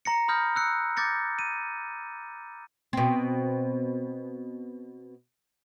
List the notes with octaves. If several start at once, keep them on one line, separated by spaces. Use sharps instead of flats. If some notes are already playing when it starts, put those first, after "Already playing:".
A#5 A#6 C#7
B5 D#6 F6 G6 A#6
E6 F#6 C#7
D6 G6 A6 A#6 C#7
D#7
B2 C4